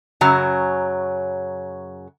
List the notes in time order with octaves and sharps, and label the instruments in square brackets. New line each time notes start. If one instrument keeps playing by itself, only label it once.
[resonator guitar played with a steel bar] F#2 C#3 F#3 A#5